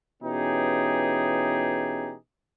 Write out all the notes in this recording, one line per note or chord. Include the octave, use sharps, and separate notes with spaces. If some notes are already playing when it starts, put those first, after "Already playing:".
B2 E3 C#4 D#4 G4 G#4